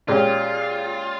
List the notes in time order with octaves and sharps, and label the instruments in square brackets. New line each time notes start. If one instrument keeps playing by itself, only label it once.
[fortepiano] A#2 G#3 C#4 G4 [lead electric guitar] F4